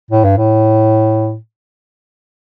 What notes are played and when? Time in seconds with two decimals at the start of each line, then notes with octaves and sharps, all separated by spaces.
0.11 A2
0.24 G2
0.37 A2